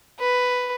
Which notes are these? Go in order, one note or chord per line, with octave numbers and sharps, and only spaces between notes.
B4